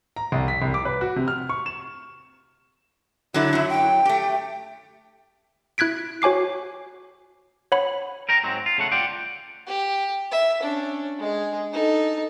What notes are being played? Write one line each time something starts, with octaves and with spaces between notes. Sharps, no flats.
A#5
C2
B6
C2
D6
B4
F#4
C3
F6
C#6
E7
D3 F#3 E4
F#2 F#3
G5
A3 G4
E4 F#6 G#6 B6 D7
F#4 C#5 G#5 D6 C7
C#5 F#5 B5
A#4 G5 A#5
G#2 F#3 C4
F4
C#3 A3 F#5
F4 D5 F#5 G5
G4
E5
C#4 D4
G#3 G#4
D#4 A4